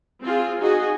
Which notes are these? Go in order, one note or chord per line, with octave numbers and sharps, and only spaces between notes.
C4 F4 G#4
D#4 F#4 G#4 D#5